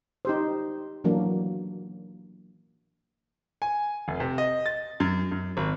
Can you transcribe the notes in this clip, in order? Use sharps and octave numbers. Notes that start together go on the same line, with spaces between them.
D#4 G4 C5
E3 F#3 A#3 D4
G#5
F1
C3
D#5
A6
F#2
F#2
G#1